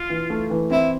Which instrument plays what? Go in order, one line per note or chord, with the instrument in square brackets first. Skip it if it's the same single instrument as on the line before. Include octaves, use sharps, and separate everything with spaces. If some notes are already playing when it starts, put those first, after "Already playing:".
Already playing: [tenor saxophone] F4
[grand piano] E3
A3
E3
[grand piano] C4 [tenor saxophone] E4